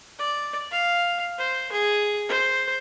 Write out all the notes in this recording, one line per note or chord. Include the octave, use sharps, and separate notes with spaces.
D5
F5
C5
G#4
C5